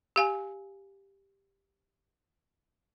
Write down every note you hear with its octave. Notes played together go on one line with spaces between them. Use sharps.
G4 F5 G#5